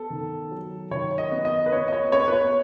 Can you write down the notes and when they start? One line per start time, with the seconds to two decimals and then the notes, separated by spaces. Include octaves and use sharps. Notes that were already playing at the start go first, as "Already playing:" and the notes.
Already playing: B3 A4
0.10 D#3
0.51 F#3
0.91 D#3 C#5
1.18 D#5
1.32 B3
1.45 D#5
1.66 B4
1.72 B3 C#5
1.88 D#5
1.93 C#5
2.12 B3 C#5
2.28 B4
2.33 C#5